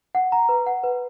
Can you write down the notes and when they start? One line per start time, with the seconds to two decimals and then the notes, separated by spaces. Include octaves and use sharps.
0.15 F#5
0.32 A#5
0.49 B4
0.67 F#5
0.84 B4